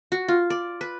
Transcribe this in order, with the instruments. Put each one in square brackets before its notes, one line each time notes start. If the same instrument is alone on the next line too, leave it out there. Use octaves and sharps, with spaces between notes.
[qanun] F#4
F4
D5
B4